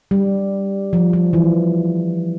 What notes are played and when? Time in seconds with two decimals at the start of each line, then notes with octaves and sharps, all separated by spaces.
0.11 G3
0.93 F3
1.13 F3
1.33 E3